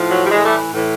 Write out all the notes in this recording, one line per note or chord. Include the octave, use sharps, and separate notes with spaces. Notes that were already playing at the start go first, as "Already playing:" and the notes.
Already playing: A2 F3
F#3
G3
A2 E3 F#3 G#3
G3 A3
A2 E3